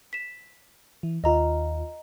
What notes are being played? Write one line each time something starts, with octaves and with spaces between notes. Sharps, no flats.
B6 E7
E3
D#2 F4 D#5 A#5